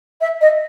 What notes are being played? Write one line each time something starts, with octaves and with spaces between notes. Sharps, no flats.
E5
D#5